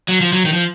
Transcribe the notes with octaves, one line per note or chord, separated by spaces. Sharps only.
F#3
F3
F#3
D#3
F3